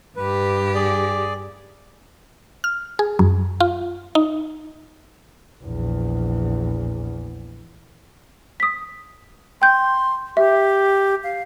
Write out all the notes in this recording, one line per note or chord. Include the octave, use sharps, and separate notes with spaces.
G2 G4 B4
G#4 D5
F6
G#4
F#2
F4
D#4
A#1 E2
D#6 B6
G5 C6 G6
G4 E5
F5